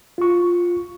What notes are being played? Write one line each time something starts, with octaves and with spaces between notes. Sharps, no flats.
F4 C#6